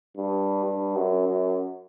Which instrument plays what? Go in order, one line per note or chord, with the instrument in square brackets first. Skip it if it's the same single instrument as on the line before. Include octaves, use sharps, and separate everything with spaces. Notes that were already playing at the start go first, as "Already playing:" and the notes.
[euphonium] G2
G2
F#2
F#2